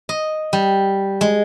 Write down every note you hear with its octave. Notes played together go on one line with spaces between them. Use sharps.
D#5
G3
G#3